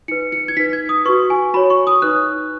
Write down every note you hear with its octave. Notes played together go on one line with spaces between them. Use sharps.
D#4 B4 C#7
C#7
G#6
D#4 B4 B6
G#6
D#6
F#4 B4 C#6
G#5
F#4 C#5 B5
C#6
D#6
D#4 B4 F#6